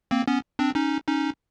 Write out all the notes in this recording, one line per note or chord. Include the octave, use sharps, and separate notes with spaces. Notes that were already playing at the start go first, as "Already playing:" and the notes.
A#3 C4
B3 C#4
C4 D4
C#4 D#4
C#4 D#4